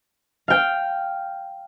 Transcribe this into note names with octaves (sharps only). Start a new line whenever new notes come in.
F5 G5